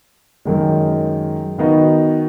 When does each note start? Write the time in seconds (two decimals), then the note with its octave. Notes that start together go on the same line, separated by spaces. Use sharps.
0.45 F#2 D#3 G#3
1.58 D#3 B3 D#4 F#4